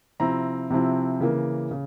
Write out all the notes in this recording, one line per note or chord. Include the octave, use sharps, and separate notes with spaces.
C3 F3 C4 E4 A#5
C3 F3 C4 E4
C#3 E3 A#3
C#3